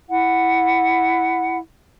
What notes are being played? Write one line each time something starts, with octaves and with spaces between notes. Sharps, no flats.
E4 F#5